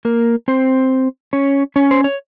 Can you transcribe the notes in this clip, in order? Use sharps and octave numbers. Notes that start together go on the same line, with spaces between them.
A#3 A#4
C4 C5
C#4 C#5
C#4 C#5
C5
C#5